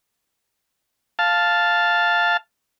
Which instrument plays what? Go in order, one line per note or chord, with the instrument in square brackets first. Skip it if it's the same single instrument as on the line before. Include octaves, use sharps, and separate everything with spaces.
[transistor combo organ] F5 A5